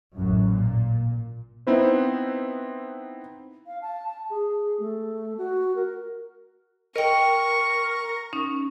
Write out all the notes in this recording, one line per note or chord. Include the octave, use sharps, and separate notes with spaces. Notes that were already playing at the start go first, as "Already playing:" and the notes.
A1 F#2
A#2
B3 C4 D#4 E4 B4 C5
F5
A5
A5
G#4
A3
F#4
A#4
A#4 D#5 G5 C#6
C#4 D#4